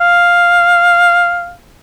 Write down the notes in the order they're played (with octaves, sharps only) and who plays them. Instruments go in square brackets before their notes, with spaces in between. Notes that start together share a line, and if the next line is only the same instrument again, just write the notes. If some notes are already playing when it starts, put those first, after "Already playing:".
[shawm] F5